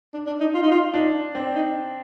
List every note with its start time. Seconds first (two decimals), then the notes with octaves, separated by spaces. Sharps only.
0.14 D4
0.27 D4
0.40 D#4
0.54 F4
0.63 D#4
0.71 F4
0.94 D4 D#4
1.35 C4 D4
1.55 D#4